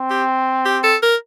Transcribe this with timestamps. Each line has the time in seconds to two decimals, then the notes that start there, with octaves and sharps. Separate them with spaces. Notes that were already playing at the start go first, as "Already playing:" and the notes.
Already playing: C4
0.11 G4
0.65 G4
0.84 A4
1.02 A#4